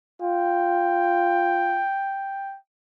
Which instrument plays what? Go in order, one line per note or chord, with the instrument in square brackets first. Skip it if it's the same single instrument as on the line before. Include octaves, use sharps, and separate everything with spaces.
[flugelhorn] F4 [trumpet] G5